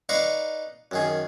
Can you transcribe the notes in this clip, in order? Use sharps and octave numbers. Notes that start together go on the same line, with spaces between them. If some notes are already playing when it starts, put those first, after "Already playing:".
D#4 B4 D5 F5 A#5 C#6
F#2 D#3 G#4